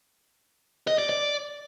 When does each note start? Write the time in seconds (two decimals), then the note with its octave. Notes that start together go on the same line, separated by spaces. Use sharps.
0.87 D#5
0.98 D5
1.09 D5